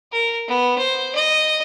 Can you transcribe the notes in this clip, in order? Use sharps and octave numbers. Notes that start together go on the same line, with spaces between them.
A#4
B3
C5
D#5